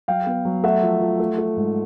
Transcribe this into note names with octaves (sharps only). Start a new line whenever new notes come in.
F#3 F5 G5
B3
F#3
A3 E5 F#5
F3
F3
A3
A3
G#2